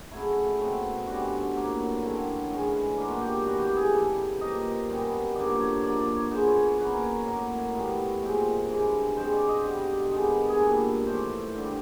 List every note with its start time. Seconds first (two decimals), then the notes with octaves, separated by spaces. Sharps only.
0.11 C#3 F#3 A3 E4
0.60 B2 F#3 A3 C4
1.07 F#2 D3 G3 F#4
1.54 A2 F#3 A#3
2.02 D3 F#3 A3 C4
2.50 A2 E3 G#3 C#4
2.98 B2 F#3 A#3 D4 F4
3.09 F#4
3.21 G4
3.34 G4
3.45 A2 E3 G3 F#4
3.62 G4
3.76 G#4
3.93 C#3 E3 G3 A4
4.40 C3 F3 A#3 D#5
4.88 F#2 D#3 G3 B3
5.35 G2 D3 F3 A#3 D5
5.60 C#5
5.83 D3 F3 A#3 D5
5.99 D5
6.16 C#5
6.31 G#2 F3 G#3 B3 C5
6.47 C#5
6.62 C#5
6.78 C#3 F#3 A#3 C#4 B4
6.94 A#4
7.26 A2 F#3 A#3 A#4
7.74 A2 E3 G3 B3
8.22 A#2 F3 G#3 C4
8.69 G2 E3 G#3
9.17 B2 G#3 C4 C5
9.32 D5
9.49 D#5
9.64 G2 D3 G3
10.12 G2 D#3 G#3 B3
10.49 G#4
10.60 A#2 G3 B3 A4
11.07 A2 E3 A3 D4 C5
11.55 G2 D3 G3